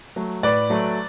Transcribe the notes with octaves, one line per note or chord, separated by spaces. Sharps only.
F#3 A3
A2 B4 D5
F#3 A3